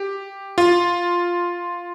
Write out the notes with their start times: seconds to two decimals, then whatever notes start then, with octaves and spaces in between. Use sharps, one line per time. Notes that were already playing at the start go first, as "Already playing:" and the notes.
Already playing: G4
0.58 F4